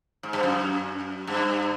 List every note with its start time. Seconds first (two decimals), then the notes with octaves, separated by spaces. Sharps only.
0.23 G#2
0.33 G2
0.43 F#2
1.27 G2